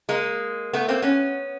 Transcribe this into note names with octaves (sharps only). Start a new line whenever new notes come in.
G#3 A#3
A3 B3
A#3 C4
B3 C#4